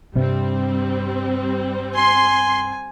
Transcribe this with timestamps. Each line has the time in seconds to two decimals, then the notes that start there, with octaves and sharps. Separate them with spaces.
0.16 G2 C3 G3 C4
1.95 G#5 C6